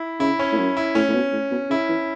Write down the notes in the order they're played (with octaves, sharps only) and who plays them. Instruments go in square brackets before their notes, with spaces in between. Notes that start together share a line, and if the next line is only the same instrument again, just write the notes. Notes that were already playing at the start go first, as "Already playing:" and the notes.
Already playing: [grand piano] E4
[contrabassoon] C#3 [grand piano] E4
[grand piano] C#4
[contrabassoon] A2
F#2
[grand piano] E4
[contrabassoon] A2 [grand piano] C#4
[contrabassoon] A2
B2
A2
B2
[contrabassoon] C#3 [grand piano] E4
[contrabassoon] E3